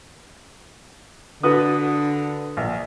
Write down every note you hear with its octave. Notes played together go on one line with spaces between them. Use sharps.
D3 F#4 B4 D#6
A#1